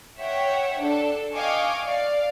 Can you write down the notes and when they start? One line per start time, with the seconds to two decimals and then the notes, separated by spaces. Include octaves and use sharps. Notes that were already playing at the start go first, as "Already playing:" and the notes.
0.18 C#5 E5 F#5 G5
0.79 D4 A4
1.33 D#5 F5 G5 G#5 C#6 D6
1.84 D5 F5